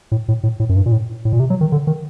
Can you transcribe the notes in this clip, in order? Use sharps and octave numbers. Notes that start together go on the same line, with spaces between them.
A2
A2
A2
A2
F#2
G2
A#2
A2
A2
A#2
C3
F#3
D#3
D3
D#3